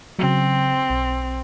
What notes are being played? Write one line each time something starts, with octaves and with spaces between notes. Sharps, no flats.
C#3 F#3 C4
B1